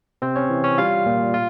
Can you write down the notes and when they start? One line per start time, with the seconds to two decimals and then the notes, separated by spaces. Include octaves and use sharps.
0.22 C3 C4 C5
0.36 C#4 C#5
0.50 E3
0.64 C#4 C#5
0.78 G3 F4 F5
1.06 A#2
1.34 F4